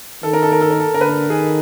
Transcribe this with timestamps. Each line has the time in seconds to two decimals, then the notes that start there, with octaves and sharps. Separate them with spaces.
0.23 D#3 A4
0.33 A#4
0.43 A4
0.52 A#4
0.61 A4
0.71 A#4
0.80 A4
0.94 D3 A#4
1.01 B4
1.09 A#4
1.29 D#3 G#4